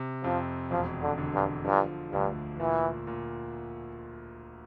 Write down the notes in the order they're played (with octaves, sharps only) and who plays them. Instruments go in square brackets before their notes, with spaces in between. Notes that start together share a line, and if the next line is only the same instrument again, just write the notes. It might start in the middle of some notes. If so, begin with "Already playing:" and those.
Already playing: [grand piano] C3
[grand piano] F2 [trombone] F3
[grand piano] E1 [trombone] F3
[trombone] D3
[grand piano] D3
[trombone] G2
[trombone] G2 [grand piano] F3
[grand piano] D2 [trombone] G2
[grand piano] A#2 [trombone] E3
[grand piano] A#2